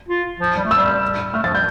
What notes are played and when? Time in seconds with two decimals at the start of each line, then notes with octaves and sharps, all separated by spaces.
0.09 F4
0.40 F3
0.56 G3
0.65 A3
0.71 G3 E6
1.34 A3 F6
1.44 F3 A6
1.54 G3 G6